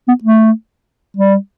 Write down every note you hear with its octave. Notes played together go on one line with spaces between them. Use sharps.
B3
A3
G3